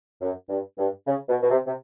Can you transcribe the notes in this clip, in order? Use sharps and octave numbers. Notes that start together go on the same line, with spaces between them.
F#2
G2
G2
C#3
B2
B2
C3
C3